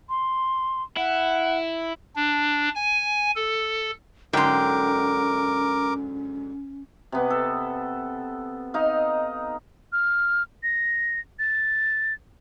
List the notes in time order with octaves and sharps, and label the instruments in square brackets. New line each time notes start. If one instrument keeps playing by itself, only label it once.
[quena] C6
[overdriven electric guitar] E4 [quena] F#5
[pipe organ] D4
G#5
A4
[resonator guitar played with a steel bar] G#2 D3 F#3 [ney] C#4 [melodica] A#4 D6 [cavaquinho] G5 C6
[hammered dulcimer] C3 B3
A4
D#4 D#5 F5
[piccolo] F6
A#6
A6